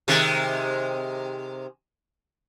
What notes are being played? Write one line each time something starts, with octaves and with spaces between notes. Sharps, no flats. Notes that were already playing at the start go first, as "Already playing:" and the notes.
C3 D#3 G#3